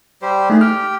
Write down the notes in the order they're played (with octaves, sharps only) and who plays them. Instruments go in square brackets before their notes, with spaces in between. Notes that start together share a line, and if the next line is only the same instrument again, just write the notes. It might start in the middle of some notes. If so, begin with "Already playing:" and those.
[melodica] G3 G4 C5
[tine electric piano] A3 D#4 [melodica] G#4
[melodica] G4 G5 [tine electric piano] F6